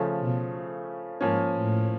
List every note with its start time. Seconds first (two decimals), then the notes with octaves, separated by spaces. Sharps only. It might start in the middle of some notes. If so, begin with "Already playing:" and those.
Already playing: C#3 F3 A3 C#4
0.19 B2
1.21 G#2 F3 A#3 C#4
1.55 A2